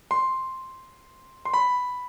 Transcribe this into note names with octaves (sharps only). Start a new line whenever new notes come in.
C6
C6
B5